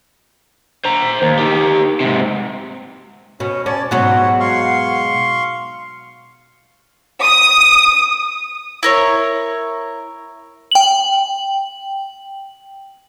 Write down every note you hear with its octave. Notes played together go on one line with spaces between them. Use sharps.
C5 A#5
D#2
D#4 G4
G#2 C3
B2 C#4
C#4 D5 A5
G#2 B2 F#3 F#5
F5 C6 C#6
D#6
E4 A#4 C#5
G5 F#7